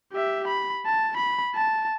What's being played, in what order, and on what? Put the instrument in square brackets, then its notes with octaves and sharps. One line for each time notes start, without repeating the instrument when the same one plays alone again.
[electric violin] G4 E5
B5
A5
B5
A5